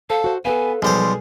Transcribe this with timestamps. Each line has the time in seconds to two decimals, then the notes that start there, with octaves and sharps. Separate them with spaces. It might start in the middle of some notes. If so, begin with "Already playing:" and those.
0.10 A4 C5 F5
0.24 F#4 C5
0.45 B3 A4 B4 F5 G#5
0.82 B1 F3 G3 G#4 C5 C6